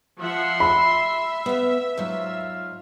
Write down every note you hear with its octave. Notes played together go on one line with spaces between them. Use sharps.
F3 E5 F#5 C6
E5 B5
B3 F5
G#2 F#3 F4